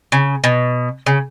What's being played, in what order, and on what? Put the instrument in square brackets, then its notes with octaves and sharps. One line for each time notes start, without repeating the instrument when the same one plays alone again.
[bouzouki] C#3
B2
C#3